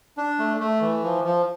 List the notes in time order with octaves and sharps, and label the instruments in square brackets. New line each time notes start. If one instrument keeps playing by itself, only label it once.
[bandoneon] D4
A3
A3
E3
F3
F3